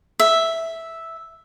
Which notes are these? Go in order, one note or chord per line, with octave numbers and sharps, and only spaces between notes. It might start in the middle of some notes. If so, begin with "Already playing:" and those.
E5